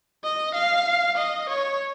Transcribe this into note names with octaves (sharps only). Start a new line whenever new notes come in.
D#5
F5
D#5
C#5